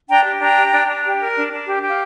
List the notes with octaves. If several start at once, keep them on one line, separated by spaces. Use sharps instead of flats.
D4 G5 A#5
G4
D4 G5 A#5
G4
D4
D4
G4
A#4
D4
D4
G4
G4
F5